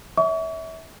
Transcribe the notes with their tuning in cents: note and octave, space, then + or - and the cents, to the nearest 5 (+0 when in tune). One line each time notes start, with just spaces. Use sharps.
C#5 +35 E5 -25 C#6 +40